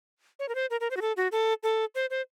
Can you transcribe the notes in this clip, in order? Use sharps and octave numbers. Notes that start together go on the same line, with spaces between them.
C#5
A#4
C5
A#4
A#4
C5
F#4
A4
F#4
A4
A4
C5
C5